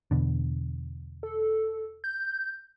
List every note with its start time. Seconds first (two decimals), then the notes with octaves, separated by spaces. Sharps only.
0.11 E2 B2 D3
1.23 A4
2.04 G6